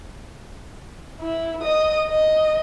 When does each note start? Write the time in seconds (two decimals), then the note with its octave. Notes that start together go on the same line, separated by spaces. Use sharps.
1.21 E4
1.62 D#5 D#6
2.09 D#5